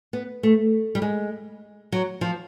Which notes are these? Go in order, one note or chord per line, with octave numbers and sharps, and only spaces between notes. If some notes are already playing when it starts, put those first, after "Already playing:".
B3
A3
G3
G#3
F#3
F3